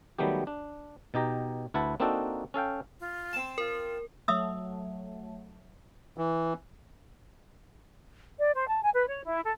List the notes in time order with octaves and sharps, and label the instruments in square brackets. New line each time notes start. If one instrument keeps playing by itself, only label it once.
[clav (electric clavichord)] D#3 F#3 G3 A3 B3 G4
D4
B2 D#4 G4 A#5
D2 E4 B4 F#5 A5
A#3 C4 D4 D#4 F#4 A4
C#4 A4 F5 G5
[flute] F4
[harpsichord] C4 A5
[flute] F4 [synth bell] A#4
[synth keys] F#3 A3 [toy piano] E5 D#6 E6
[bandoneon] E3
[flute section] D5
C5
A5
G#5
B4
C#5
E4
A4